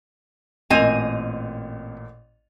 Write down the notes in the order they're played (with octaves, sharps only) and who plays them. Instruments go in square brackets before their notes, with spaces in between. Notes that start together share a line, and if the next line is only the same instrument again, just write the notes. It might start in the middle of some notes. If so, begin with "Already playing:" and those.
[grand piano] A1 A#2 F7 [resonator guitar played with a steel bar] C4 D#5 G#5